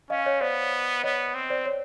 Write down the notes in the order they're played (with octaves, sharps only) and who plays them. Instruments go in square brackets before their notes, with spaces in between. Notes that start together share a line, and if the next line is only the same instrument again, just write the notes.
[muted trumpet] C#4 [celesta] D#5 F5
[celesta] C#5 D#5
[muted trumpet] B3 [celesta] C5 D5
[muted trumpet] B3 [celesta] C#5 D#5
[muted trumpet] C4
[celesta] C5 D5
C#5